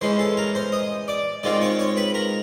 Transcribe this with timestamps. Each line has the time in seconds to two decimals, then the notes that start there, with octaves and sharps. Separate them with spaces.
0.01 E3 G#3 C#4 C5 C6
0.19 A4 A5
0.37 A#4 A#5
0.55 C5 C6
0.72 D#5 D#6
1.08 D5 D6
1.43 D#3 G#3 C4 F4 D5 D6
1.61 C#5 C#6
1.79 C#5 C#6
1.97 B4 B5
2.14 A#4 A#5